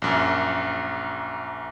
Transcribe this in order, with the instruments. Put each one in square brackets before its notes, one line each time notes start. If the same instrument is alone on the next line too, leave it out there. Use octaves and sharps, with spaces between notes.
[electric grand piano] A#1 F#2